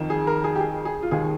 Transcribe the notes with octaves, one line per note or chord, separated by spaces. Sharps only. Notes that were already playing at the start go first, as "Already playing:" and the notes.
Already playing: F2 D#3
G#4
A#4
G#4
G4
G#4
G#4
F4
D#2 D#3 G#4